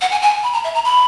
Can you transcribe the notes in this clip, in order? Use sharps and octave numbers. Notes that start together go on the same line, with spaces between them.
F#5
G#5
G#5
B5
A#5
E5
A#5
B5